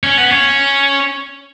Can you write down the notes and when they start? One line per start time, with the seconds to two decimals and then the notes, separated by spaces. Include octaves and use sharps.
0.03 C#4
0.17 B3
0.31 C#4